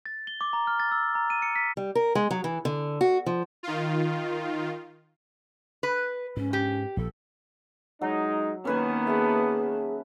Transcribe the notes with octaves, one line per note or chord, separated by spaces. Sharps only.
A6
G7
D6
A#5
F6
A6
E6
A#5
D#7
C#7
B6
G3
A#4
G#3
F#3
E3
D3
F#4
F3
D#3 F4
B4
G#2 C#4
G4
A#1 F3 A4
F#3 G#3 D#4
D#3 A#3 B3 C#4 B4 G#5
G#4 E5 A5